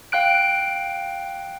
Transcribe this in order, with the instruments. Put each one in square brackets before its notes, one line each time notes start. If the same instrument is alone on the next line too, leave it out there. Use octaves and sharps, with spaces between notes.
[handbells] F5 G5 F#6 D7